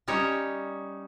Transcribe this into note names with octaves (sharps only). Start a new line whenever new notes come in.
G3 C#4 D#4 C#5